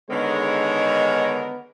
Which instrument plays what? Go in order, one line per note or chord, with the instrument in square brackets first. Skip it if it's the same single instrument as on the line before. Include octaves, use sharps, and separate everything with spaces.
[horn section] D3 D#3 A#4 [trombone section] G#3 [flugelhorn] B3 [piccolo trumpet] C#5